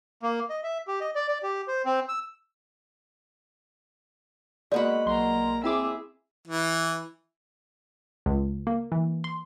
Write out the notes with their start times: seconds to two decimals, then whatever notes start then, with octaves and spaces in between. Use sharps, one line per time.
0.22 A#3
0.50 D#5
0.64 E5
0.87 G4
1.01 D#5
1.15 D5
1.28 D5
1.43 G4
1.68 C5
1.85 C4
2.09 E6
4.72 G#3 A#3 B3 F#4 D5 B5
5.06 B1 A#3 A#5 C6
5.64 C4 E4 G#4 E5 D6
6.48 E3
8.26 C#2
8.67 A#3
8.92 E3
9.24 C6